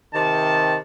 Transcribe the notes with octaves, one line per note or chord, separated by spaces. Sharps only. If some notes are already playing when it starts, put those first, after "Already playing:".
C3 D#3 A5